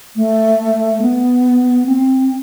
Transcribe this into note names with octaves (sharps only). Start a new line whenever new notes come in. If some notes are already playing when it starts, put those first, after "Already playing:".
A3
B3
C4